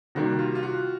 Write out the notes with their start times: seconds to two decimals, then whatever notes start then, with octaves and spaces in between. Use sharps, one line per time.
0.15 C3 D#3 G3 A#3 F#4
0.39 F4
0.55 F4
0.63 F#4